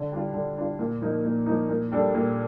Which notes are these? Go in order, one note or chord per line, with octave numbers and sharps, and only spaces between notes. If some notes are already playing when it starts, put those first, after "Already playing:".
Already playing: D3
G3 D4 F4
D3
G3 D4 F4
A#2
F3 A#3 D#4
A#2
F3 A#3 D#4
A#2
G3 D4 A4
A#2